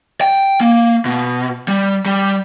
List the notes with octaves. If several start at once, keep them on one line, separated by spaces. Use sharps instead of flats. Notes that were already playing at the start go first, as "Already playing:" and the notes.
G5
A#3
B2
G3
G3